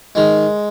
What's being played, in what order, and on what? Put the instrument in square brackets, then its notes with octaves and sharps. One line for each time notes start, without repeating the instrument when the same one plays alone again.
[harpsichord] D#3 G#3